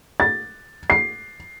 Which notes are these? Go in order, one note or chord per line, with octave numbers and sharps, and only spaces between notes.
A6
C7